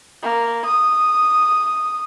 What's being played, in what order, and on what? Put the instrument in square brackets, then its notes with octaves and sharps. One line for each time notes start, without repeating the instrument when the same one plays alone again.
[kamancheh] A#3
D#6